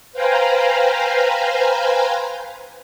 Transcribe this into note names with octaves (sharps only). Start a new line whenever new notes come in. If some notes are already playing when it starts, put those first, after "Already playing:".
B4 C5 F5 G5 G#5 A#5